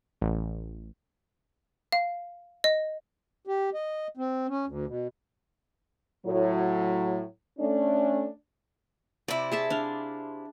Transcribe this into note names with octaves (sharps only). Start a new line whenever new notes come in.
A1
F5
D#5
G4
D#5
C4
C#4
D2
B2
A2 F#3
A3 C#4 D4
C3 E4 D5
G#4 E5 A5
D4 F5